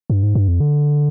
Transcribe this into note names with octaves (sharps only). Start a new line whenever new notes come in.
G2
G#2
G2
F2
D3